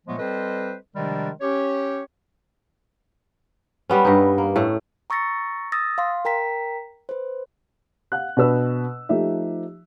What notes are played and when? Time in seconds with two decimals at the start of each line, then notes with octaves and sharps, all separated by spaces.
0.07 A#2 F3 F#3 G#3 A3 B3
0.19 G3 C4 A4 B4 C5 D#5
0.95 C3 D#3 F3 G3 G#3 D4
1.41 C#4 G4 C#5
3.90 G3 B3 C#4
4.05 G2 D#4
4.38 A#3
4.56 A2 A3
5.10 A#5 C#6 E6 A6 A#6 C#7
5.72 D#6 E6 A6 A#6
5.98 F5 C6
6.25 A#4 G5 A#5 B6
7.09 B4 C5
8.12 F5 F#5 F#6
8.37 B2 D4 B4 E6
9.09 F3 A3 D#4 G4 E5